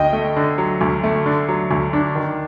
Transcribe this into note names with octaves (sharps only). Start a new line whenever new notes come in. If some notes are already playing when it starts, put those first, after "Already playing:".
Already playing: D2 D#5 G5
A3
D3
F#3
D2
A3
D3
F#3
D2
D4
D#3